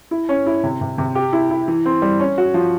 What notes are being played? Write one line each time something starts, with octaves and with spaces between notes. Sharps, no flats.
E4
C#4
E4
C3
C3
C3
G4
E4
E4
E3
C4
G3
C#4
F#4
F3